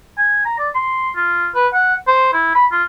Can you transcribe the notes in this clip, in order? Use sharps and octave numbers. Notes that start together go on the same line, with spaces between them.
G#5
A#5
D5
C6
F4
B4
F#5
C5
E4
B5
F4